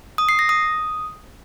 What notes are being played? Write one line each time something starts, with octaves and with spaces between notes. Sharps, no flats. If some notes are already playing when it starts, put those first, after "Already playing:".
D#6
C7
A#6
D#6